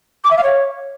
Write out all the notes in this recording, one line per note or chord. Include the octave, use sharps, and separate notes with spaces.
D6
E5
F5
C#5